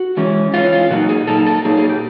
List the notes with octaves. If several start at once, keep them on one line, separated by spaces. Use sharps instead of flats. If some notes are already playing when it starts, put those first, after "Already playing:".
Already playing: F#4
E3 G#3 C#4
E3 G#3 C#4 F4
F4
A#2 F#3 A#3 D#4 F#4
G#4
A#2 F#3 A#3 D#4 A4
A4
A#2 F#3 A#3 D#4 G#4
G#4
G4